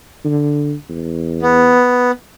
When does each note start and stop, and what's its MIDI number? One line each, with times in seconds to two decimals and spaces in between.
0.25 0.75 50
0.89 1.77 40
1.42 2.11 59